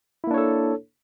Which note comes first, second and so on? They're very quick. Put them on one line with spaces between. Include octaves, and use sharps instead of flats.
E4 A#3 D4 C#5 A4